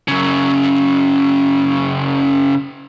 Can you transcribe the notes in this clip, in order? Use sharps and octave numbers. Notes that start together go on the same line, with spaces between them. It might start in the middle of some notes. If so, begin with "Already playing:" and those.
F#2 C#3